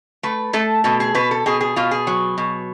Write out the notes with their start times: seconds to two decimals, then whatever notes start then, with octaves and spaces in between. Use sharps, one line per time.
0.23 A3 B4
0.53 A3 A4
0.84 B2 A4
1.00 G#4
1.15 B2 B4
1.31 A4
1.46 B2 G#4
1.61 G#4
1.76 B2 F4
1.91 G#4
2.07 F#3
2.38 B2